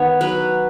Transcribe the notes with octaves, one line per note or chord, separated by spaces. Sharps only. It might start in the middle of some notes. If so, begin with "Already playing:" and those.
Already playing: D#3 B3 C#5
F#3 B4